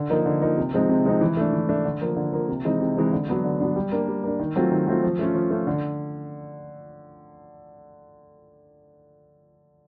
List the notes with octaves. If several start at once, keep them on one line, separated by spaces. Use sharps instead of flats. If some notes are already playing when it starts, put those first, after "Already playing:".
Already playing: D3
F3 A#3 D#4
D3
F3 A#3 D#4
C3
F3 G#3 C4 D#4
C3
F3 G#3 C4 D#4
E3
A3 D4
E3
A3 D4
D3
F3 A#3
D3
F3 A#3
C3
E3 G#3 C4 D#4
C3
E3 G#3 C4 D#4
D3
F#3 B3 D4
D3
F#3 B3 D4
G3
A#3 D4
G3
A#3 D4
D#3
F#3 A3 C4 F4
D#3
F#3 A3 C4 F4
F3
A3 C#4 F4
F3
A3 C#4 F4
D3